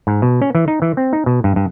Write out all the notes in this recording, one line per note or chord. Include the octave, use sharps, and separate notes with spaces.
G#2
B2
C#4
E3
D#4
E3
C4
D#4
B2
G2
G2